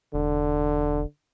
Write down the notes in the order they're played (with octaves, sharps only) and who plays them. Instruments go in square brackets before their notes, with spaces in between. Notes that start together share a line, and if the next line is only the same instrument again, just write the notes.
[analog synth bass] E1 [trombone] D3